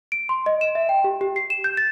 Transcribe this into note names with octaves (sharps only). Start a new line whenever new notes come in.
D7
C6
D#5
E7
E5
G5
G4
G4
C7
E7
G6
A6